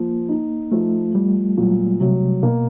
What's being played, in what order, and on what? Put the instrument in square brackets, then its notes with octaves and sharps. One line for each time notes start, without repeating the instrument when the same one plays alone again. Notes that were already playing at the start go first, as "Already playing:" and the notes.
Already playing: [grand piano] F3 [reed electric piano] A#3
[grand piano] D#4
[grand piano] F3 [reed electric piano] A3
[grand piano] F3 [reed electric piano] G3
[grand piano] A#2 [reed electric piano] F#3
[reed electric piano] C3 [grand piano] F#3
[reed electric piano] B2 [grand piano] A#3